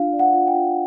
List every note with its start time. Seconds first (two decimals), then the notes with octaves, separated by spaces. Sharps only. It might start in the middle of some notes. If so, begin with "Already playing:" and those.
Already playing: D4 F4 F5
0.13 D5
0.19 F#5
0.34 F4
0.47 G5
0.54 F4